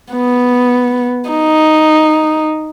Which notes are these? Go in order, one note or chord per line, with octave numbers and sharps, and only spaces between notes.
B3
D#4